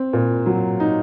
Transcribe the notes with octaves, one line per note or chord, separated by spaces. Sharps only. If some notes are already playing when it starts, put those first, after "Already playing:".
Already playing: C4
A#2
F#3
D#4